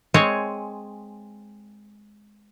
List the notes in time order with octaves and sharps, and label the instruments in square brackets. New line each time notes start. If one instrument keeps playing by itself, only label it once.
[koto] G#3 C4 C#5 G#5